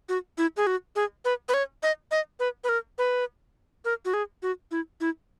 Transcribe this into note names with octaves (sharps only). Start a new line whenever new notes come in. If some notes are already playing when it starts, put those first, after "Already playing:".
F#4
E4
G#4
F#4
G#4
B4
B4
C#5
D#5
D#5
B4
B4
A#4
B4
A#4
F#4
G#4
F#4
E4
E4